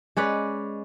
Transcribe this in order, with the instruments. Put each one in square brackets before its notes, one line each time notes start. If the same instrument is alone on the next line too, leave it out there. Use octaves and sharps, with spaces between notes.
[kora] G#3 C#4 B4 D5